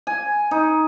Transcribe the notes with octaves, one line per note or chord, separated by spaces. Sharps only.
G#5
D#4